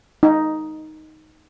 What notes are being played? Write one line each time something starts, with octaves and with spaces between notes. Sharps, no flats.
D#4